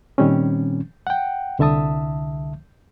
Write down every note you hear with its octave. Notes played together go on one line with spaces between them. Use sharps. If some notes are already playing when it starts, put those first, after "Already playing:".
A#2 D#3 G3 C4 C#4
F#5 G5
C2 D3 E5 A5 D#6